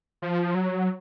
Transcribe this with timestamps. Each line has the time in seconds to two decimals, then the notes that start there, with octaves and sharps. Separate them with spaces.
0.22 F3
0.55 F#3